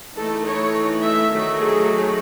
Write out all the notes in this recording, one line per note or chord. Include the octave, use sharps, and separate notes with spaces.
E3 A3 D#4 A4
C#5
E5
D#3 F#3 A3 D#4
G#4